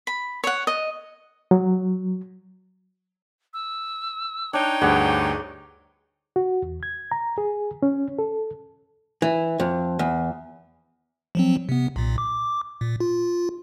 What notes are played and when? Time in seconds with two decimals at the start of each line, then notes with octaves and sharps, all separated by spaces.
0.07 B5
0.44 C#5 F#5
0.67 D#5
1.51 F#3
3.54 E6
4.53 D4 D#4 C#5 G5
4.81 D2 G2 G#4 D5 F#5
6.36 F#4
6.62 E2
6.83 G#6
7.12 A#5
7.38 G#4
7.83 C#4
8.19 A4
9.22 E3
9.60 F2
9.99 E2
11.35 F3 F#3 C4
11.69 C3 B3
11.96 B1 A#2
12.18 D6
12.81 A#2
13.00 F4